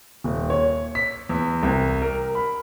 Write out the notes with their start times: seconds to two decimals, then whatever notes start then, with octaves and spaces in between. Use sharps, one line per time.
0.24 D#1
0.50 C#5
0.95 B6
1.29 E2
1.63 C2
2.02 A#4
2.35 B5